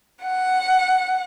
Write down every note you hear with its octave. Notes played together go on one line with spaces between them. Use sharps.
F#5